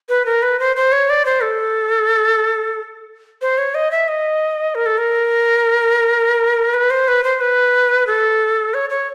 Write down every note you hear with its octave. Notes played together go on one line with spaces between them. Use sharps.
B4
A#4
B4
C5
C5
C#5
D5
C5
A4
C5
C#5
D#5
E5
D#5
A#4
A4
A#4
B4
C5
B4
C5
B4
A4
C#5
C#5